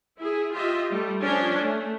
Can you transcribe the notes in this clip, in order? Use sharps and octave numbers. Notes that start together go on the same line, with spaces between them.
E4 G#4
F4 G4 D#5 E5
G3 A3
F3 C#4 D4
A3